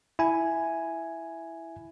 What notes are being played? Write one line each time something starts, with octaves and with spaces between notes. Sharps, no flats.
E4 G#5